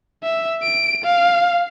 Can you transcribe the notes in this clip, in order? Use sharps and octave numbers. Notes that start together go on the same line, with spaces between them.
E5
D7
F5